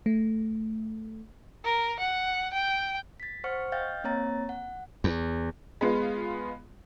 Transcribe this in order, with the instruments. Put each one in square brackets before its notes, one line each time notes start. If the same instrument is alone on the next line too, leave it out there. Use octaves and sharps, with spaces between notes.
[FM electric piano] A3
[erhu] A#4
F#5
G5
[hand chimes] A6 B6
C5 F#5 C#6 F6 C#7
D#5 F5 G5 F6 G6 A6
A#3 C4 C#5 A#5 A6
F#5
[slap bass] E2
[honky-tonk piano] G#3 B3 F4